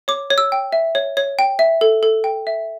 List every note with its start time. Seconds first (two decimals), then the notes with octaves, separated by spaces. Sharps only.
0.08 C#5 D6
0.30 C#5
0.38 E6
0.52 G5
0.72 E5
0.95 C#5
1.17 C#5
1.39 G5
1.59 E5
1.81 A4
2.03 A4
2.24 G5
2.47 E5